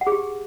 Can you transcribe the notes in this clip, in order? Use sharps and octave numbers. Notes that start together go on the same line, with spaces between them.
F#5
G#4
G4